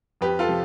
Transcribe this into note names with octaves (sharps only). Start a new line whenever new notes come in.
F2 G4 B4
F4 A4
C3 F3